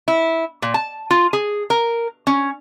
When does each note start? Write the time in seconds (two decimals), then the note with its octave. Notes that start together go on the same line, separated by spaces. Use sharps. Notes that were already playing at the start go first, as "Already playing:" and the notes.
0.08 E4
0.62 A#2
0.74 A5
1.11 F4
1.33 G#4
1.70 A#4
2.27 C#4